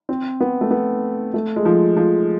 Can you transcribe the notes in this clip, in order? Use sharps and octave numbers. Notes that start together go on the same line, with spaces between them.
C4
B3
A3
B3
A3
G#3
F3
F3